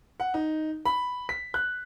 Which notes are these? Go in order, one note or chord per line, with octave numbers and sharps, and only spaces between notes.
F#5
D#4
B5
B6
F#6